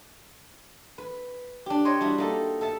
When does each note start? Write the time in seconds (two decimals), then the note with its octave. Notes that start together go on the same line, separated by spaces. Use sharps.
0.98 B4
1.66 D4 G4
1.85 C5 C#5 D#5
2.01 G3 D4 E4 F#4
2.18 A#3 D#4 A4
2.61 A4 E5 A5